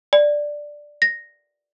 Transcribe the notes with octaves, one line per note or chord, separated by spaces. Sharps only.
D5
A#6